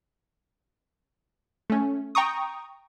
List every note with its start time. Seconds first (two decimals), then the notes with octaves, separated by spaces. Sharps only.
1.70 A3 C#4
2.15 G5 A#5 C#6 D#6